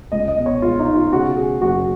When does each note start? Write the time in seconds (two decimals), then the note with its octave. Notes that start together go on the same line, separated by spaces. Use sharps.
0.12 C#2 D#5
0.28 D#5
0.37 B2
0.46 C#5
0.62 G#3 F4
0.79 D#4
0.87 B2
0.95 F4
1.12 C#3 F#4
1.37 C#3 G#4
1.62 F#1 F#4